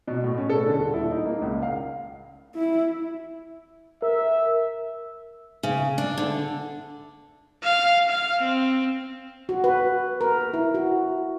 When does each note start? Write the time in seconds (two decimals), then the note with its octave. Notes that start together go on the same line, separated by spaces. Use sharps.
0.08 B2
0.24 A2
0.38 C#4
0.50 A4
0.66 D3
0.78 D#1
0.94 E4
1.11 D#4
1.25 A#3
1.42 C#2
1.62 F5
2.55 E4
4.02 A#4 E5
5.63 C#3
5.98 D4
6.18 D3
7.64 F5
8.09 F5
8.41 C4
9.49 F#4
9.64 B4
10.21 A#4
10.53 E4
10.75 F#4